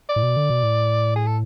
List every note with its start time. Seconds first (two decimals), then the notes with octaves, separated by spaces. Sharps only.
0.09 D5
0.16 A2
0.23 B2
0.37 D3
0.50 B2
0.63 A2
1.16 G#4
1.27 A4